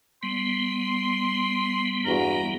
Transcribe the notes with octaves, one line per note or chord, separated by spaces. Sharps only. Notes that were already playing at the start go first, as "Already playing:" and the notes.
G3 B3 C6
E2 G2 F#4 A#5